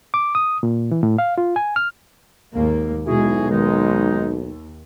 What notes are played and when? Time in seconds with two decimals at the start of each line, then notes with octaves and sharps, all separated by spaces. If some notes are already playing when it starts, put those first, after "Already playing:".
0.14 D6
0.35 D#6
0.63 A#2
0.91 E3
1.03 A2
1.18 F5
1.38 F4
1.56 G#5
1.76 F6
2.54 D#2 G#2 A#3
3.06 B1 B2 G#3 E4 F#4 G#4
3.50 D#2 D#3 G#3 D#4